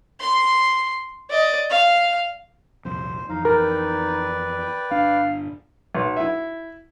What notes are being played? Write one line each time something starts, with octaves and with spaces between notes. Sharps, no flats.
C6
D5 D#5
F5
D#1 C2 F2 C5
F2 E3 D#4 F5
A#4 B4 D5 G5
G1 D4 F5
B1
E4 E5